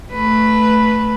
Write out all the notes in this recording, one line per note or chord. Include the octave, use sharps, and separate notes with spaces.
A3 B4